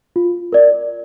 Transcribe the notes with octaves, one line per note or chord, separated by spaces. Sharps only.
F4
A#4 D5